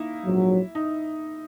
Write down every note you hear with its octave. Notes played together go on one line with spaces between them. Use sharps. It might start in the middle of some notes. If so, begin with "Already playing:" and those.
Already playing: A#3 D#4 E4
A#1 G#2 F#3
D#4